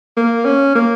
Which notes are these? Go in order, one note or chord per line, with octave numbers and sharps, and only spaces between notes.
A#3
C#4
A#3